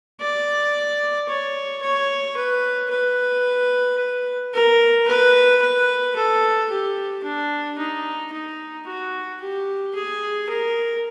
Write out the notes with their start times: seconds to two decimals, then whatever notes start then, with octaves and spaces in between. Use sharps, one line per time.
0.21 D5
1.28 C#5
1.82 C#5
2.37 B4
2.91 B4
4.54 A#4
5.07 B4
5.62 B4
6.16 A4
6.70 G4
7.23 D4
7.78 D#4
8.32 D#4
8.87 F#4
9.41 G4
9.95 G#4
10.49 A#4